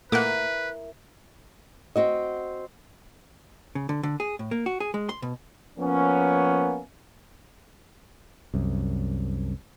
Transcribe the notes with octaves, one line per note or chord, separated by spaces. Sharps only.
A#2 A3 A#3 E4 A#4 B4 F#5 D6
C4 F#4 D#5
C#3
D3
D3
G#4
A2
A#3
F#4
G#4
G#3
C6
B2
F3 A#3 B3 C#4
C2 F#2